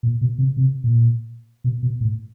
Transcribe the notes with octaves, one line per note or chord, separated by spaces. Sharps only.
A#2
B2
C3
C3
A#2
B2
B2
A2